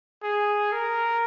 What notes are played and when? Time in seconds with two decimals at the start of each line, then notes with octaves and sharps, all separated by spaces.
0.23 G#4
0.73 A#4